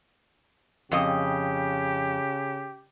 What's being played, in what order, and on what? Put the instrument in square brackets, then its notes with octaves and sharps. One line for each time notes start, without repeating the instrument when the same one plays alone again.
[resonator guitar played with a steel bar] F2 D#5 [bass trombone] C#3 [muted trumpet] G4